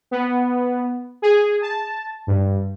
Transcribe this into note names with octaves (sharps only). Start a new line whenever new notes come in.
B3
G#4
A5
G2